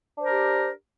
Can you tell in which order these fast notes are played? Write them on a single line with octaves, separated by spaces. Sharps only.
D4 C5 A#4 G4